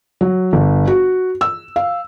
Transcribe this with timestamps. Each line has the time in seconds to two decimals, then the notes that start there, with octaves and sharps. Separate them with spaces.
0.21 F#3
0.53 G1
0.87 F#4
1.41 E6
1.76 F5